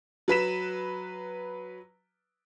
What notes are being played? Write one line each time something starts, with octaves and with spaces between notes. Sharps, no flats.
F#3 B4 B6 E7